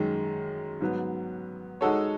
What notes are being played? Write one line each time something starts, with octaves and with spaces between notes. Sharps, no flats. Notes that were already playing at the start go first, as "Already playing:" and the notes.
Already playing: F#2 D#3 G#3
G#2 F#3 B3
G#3 D#4 F#4 A4 C#5